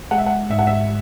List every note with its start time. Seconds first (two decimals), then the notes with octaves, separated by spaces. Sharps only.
0.11 G#3 F#5
0.18 E5
0.26 F#5
0.50 G#2 E5
0.59 F#5
0.67 E5